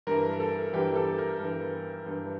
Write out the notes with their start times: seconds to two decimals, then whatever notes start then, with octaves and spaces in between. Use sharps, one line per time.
0.07 G2 E3 A#4
0.40 A4
0.73 G2 E3 G4
0.95 A4
1.18 A#4
1.40 G2 E3
2.06 G2 E3